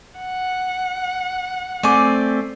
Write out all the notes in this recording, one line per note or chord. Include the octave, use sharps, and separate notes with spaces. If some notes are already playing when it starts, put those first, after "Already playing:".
F#5
A3 C4 D5 G#5 D6